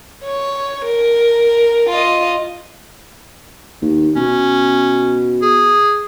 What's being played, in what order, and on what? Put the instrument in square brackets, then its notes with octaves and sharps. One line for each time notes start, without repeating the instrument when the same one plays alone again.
[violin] C#5
A#4
F4 D#5
[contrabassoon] D#2
[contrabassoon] B2 [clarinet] C#4
[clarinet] G#4